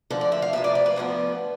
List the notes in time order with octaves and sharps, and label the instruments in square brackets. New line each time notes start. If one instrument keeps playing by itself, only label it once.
[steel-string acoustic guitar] D2 D3 F3 A4
D5
E5
F5
D2 C3 F3 E5
D5
D5
B4
D2 D3 F3 B3